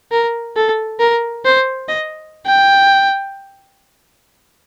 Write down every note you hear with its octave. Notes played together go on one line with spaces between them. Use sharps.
A#4
A4
A#4
C5
D#5
G5